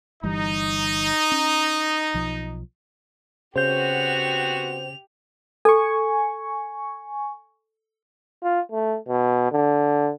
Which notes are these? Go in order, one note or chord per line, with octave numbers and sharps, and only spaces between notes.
G1 E3 G3 D#4
C#4
B1 F3
C#3 B3 C4 F#4 G4 C5 G6 F7
A4 G#5 C#6
F4
A3
B2
D3